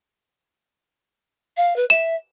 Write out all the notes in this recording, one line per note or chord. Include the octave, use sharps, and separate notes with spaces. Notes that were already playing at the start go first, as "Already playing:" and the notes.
F5
B4
E5 E7